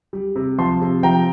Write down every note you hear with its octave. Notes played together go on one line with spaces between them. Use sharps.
G3
C3
F3 A5 C6
C3
F3 G5 A#5